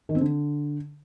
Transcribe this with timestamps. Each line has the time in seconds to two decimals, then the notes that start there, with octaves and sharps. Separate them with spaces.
0.09 D#3
0.15 C4
0.21 D3